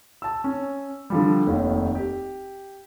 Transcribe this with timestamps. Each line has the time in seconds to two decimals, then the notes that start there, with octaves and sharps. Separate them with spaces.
0.22 A5 E6
0.44 C#4
1.10 D3 F3 G3
1.47 F1 D#2 D#3 C#5
1.95 G4